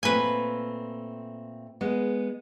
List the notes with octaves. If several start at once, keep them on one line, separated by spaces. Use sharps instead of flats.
A#2 A3 C4 B4 G#5
G#3 B3